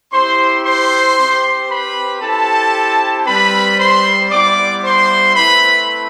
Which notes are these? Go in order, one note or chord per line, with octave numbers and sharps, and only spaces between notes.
C4 E4 G4 C5 C6
C5 C6
C4 G4
B4 B5
C4 E4 G4 A4 A5
G3 C4 G4 B4 B5
C5 C6
G3 B3 E4 G4 D5 D6
C5 C6
A3 C4 E4 B4 B5